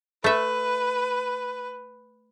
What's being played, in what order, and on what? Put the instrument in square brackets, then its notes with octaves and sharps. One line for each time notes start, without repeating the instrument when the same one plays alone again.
[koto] A3 E5 [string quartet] B4